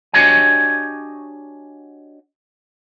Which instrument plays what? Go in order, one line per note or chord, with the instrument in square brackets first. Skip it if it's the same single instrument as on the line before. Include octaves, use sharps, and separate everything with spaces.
[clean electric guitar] D4 F#4 G4 C#5 D#5 G#5